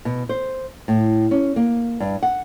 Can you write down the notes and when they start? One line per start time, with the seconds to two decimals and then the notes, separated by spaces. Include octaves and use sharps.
0.05 B2
0.29 C5
0.88 A2
1.31 C#4
1.56 A#3
2.00 G2
2.23 F#5